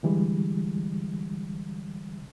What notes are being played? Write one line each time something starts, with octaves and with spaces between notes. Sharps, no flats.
D3 E3 G3 G#3